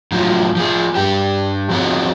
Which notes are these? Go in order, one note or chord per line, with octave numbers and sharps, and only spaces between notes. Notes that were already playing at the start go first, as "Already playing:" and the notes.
A2 F3 F#3
F3 G#4
G2 G4
F3 C4 F#4 G#4 C#5